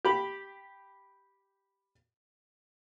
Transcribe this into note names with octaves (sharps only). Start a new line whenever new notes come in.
G4 B5